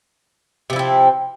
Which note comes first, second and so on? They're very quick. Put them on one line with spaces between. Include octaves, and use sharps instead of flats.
C3 F3 E4 C4